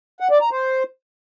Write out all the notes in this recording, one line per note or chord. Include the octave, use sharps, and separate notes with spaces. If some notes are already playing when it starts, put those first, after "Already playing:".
F#5
D5
A#5
C5